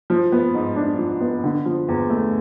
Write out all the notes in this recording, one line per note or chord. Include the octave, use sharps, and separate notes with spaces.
F3
B3
G#2
D4
F3
B3
D3
F3
E2
A3